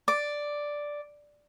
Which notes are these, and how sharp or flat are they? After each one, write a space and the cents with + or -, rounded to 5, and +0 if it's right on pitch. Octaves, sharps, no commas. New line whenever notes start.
D5 +0 D6 +0